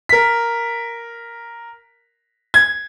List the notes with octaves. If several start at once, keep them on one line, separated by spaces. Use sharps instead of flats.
A#4 B6
G#6